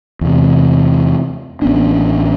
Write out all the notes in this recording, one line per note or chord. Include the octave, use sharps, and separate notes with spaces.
E2 C3
A1 B3 C#4 D4